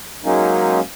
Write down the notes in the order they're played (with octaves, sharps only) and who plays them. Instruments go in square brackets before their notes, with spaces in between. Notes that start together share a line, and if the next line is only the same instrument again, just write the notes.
[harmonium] F#3 G#3 A#3 C#4 D#4